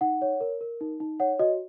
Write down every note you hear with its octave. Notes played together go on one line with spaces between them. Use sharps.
D#4 F#5
C#5
A#4
A#4
D#4
D#4
C#5 F#5
F#4 D#5